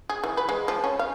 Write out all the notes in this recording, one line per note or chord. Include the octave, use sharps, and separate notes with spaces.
G#4
E3
B4
G#3
F3
C#4
F5